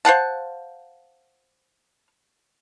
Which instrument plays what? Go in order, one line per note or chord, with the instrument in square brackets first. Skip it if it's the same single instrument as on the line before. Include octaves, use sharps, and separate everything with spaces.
[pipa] C5 F5 F#5 A5